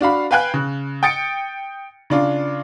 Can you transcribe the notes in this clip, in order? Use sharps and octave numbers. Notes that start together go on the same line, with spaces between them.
D4 F#4 F5 B5
B4 F5 G5 G#5 F#6
C#3
G5 D#6 A6 C#7 D7
C#3 D4 F4